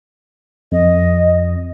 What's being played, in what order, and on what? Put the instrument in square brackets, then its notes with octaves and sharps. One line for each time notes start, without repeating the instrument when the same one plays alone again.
[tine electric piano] F2 [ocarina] D#5